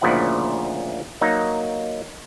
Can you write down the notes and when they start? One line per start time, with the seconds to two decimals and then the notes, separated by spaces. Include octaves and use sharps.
0.01 D2 A#2 C#3 F3 E4 F#5
1.21 F#3 A#3 D#4